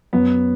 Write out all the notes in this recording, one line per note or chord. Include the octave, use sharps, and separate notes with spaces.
F#2 B3